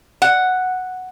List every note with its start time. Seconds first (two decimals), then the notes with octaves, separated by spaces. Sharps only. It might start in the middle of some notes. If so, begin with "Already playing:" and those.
0.22 F#5